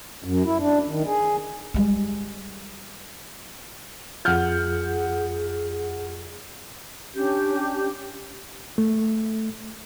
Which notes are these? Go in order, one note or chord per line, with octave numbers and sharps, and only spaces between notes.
F#2
E4
D4
D#3
G#4
G3 G#3
F2 F4 G#4 F#5 F6 G6
C#4 D4 G4 G6
A3